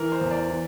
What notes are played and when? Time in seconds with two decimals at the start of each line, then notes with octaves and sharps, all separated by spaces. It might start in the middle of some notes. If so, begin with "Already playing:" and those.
Already playing: E3 A#4
0.12 C5
0.21 E2
0.31 D5
0.51 E3